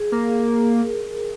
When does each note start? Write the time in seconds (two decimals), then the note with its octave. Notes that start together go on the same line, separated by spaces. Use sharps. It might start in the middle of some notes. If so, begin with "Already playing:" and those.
Already playing: G#4
0.12 A#3 A#4